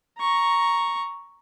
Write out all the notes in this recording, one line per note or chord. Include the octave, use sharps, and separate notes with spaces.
A#5 C#6